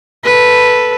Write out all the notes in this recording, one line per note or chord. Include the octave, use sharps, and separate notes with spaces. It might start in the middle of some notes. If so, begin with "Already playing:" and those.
A4 B4